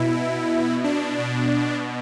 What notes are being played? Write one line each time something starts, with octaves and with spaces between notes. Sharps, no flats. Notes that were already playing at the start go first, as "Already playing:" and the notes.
Already playing: B2 E4
D4
B2